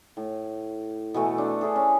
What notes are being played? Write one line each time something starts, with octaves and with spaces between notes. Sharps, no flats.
A2
B2 E3 A3
D4 C5
D4 E4 G#4 A4
C#4